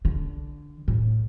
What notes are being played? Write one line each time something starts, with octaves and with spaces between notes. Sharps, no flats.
D3
A2